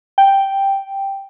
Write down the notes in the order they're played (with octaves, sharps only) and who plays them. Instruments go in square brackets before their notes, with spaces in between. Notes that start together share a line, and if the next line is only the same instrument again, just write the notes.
[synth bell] G5